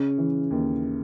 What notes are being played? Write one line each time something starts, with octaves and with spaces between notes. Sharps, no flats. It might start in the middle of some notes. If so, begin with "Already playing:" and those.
Already playing: C#3 C#4
E3
D#2